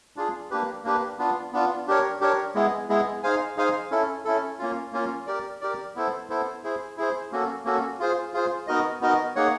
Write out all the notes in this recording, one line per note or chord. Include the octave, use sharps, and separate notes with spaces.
D4 F4 G#4
A#3 D4 G4 B4
A#3 D4 G4 B4
B3 D4 F4
B3 D4 F4
D4 G4 A#4 C#5
D4 G4 A#4 C#5
G#3 B3 E4 G#4
G#3 B3 E4 G#4
D#4 G#4 C5 F5 G#5
D#4 G#4 C5 F5 G#5
C#4 E4 A4
C#4 E4 A4
A#3 C#4 F4
A#3 C#4 F4
G4 A#4 D5
G4 A#4 D5
B3 E4 A4 C5
B3 E4 A4 C5
E4 G#4 C5
E4 G#4 C5
A#3 C#4 F#4 A4
A#3 C#4 F#4 A4
F4 G#4 C5
F4 G#4 C5
B3 D#4 F#4 A#4 D#5
B3 D#4 F#4 A#4 D#5
A#3 D#4 G#4 C#5 F#5